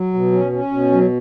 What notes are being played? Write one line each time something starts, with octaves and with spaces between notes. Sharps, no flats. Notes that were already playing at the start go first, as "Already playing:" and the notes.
Already playing: F#3
B2
C#4
C#4
B2
F#3